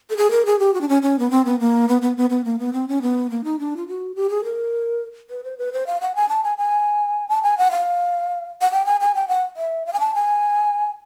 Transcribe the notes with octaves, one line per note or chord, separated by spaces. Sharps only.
A4
G#4
A#4
G#4
G4
F#4
D4
C#4
C#4
B3
C4
B3
A#3
B3
B3
B3
B3
A#3
B3
C4
C#4
B3
A#3
D#4
D4
F4
F#4
G4
G#4
A#4
B4
C5
B4
C5
F5
F#5
G#5
A5
G#5
G#5
A5
G#5
F#5
F5
F#5
G5
G#5
G#5
G5
F#5
E5
F5
G#5
A5
G#5